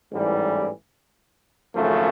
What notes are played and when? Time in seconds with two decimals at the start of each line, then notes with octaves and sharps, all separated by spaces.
0.11 A1 G#2 E3 G3
1.75 G#1 F#2 C#3 F3 A3